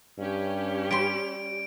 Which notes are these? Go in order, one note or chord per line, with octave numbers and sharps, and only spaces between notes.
G2 C#4 G4
G3 C6 D7